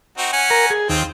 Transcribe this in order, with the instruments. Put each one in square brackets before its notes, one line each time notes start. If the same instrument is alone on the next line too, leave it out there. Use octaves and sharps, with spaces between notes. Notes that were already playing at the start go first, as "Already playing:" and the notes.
[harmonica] C4 D#4 F#4
C#4 F#5 G#5
[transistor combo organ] A#4
G#4
[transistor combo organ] D#2 [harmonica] C4 F4